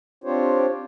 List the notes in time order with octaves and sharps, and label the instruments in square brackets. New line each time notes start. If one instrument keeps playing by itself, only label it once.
[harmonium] C4 D4 F4 G4 C5 C#5